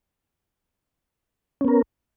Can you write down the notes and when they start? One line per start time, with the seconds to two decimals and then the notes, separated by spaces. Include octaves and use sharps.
1.61 C#4
1.65 B3
1.68 A#4